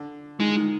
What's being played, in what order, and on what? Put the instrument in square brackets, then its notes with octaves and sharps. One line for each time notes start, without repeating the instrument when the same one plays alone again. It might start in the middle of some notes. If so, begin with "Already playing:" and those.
Already playing: [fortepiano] D3
[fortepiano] D#3 [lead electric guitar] G#3
[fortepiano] D#3